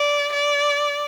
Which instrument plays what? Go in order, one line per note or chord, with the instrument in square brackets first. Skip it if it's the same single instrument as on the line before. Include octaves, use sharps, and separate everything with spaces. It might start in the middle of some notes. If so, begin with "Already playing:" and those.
Already playing: [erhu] D5
D5